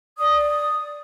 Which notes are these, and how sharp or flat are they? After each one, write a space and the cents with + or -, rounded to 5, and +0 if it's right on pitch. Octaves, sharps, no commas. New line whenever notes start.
D5 +0 D#6 +0